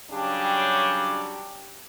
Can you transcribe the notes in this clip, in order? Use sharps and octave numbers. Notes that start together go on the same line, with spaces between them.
C#3 F#3 G3 D4 G4